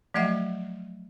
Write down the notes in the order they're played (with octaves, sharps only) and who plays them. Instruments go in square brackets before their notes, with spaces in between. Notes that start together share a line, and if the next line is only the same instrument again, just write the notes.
[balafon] F3 F#3 A3 D#5 E5 F#5